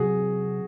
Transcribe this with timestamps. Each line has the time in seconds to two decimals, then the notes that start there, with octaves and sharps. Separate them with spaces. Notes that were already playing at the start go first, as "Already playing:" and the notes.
Already playing: C3 F#3 C4 F#4 G#4